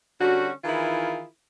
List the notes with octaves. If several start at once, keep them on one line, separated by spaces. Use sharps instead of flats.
D3 G3 C#4 F#4
D#3 E3 E4 F4 G#4 A#4